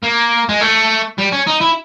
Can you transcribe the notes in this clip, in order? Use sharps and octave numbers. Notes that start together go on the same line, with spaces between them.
A#3
G#3
A3
G3
C#4
D#4
E4